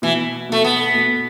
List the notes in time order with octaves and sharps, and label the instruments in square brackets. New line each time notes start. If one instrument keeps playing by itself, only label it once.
[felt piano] B2 [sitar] E3
[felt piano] B2 [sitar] A3
[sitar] B3
[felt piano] B2